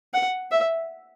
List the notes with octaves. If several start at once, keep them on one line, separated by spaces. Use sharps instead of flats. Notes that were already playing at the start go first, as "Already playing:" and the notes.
F#5
E5